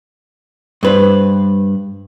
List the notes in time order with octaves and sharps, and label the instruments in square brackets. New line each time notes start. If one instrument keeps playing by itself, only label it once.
[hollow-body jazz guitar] G2 B4 C5